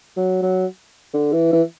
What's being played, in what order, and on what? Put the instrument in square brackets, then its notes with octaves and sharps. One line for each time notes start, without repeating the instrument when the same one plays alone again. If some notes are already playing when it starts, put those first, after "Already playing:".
[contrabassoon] F#3
F#3
D3
E3
E3